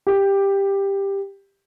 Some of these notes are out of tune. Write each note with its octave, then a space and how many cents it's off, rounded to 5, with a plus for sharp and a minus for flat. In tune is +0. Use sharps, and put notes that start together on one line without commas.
G4 +10